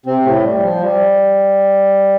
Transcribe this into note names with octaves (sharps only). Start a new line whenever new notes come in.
C3 C4
A2 A3
G3
F3
G3